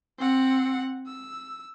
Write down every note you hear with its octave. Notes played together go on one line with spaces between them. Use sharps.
C4 F#5
E6